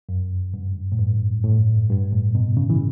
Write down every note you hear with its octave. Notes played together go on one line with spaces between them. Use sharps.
F#2
G2
A2
G2
A2
G2
A2
B2
C#3
E3